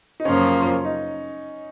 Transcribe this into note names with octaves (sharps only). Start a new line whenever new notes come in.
D#4
F#2 C#3 F3 A#3 C#4 F4
D#4